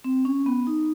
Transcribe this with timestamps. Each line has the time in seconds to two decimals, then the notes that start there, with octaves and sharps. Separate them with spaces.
0.04 C4
0.25 C#4
0.46 B3
0.67 D#4